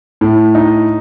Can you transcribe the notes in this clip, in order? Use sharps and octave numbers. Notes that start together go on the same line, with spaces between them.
A2
D#4